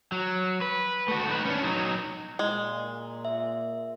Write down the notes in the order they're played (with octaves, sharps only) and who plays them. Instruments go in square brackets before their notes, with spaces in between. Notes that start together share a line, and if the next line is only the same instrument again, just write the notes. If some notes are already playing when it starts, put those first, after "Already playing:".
[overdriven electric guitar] F#3
B4
A3 F#4
D#4 B4
C#4 D4
F#3 D#4
[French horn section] A#2 [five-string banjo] G#3
[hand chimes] E5